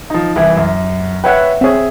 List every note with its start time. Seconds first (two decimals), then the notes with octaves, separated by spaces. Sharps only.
0.10 F3 D#4
0.36 C2 E3 E4
0.57 F#2
1.24 B4 C#5 E5 F#5 G5
1.61 C4 G#4 C#5 E5